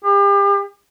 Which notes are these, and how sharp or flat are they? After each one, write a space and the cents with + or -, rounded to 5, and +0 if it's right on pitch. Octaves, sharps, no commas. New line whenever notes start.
G4 +40